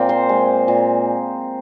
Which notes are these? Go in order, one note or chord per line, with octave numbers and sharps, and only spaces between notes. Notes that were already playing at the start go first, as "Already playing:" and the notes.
Already playing: A#2 G#3 A#3 C4
C5
G#3
A#2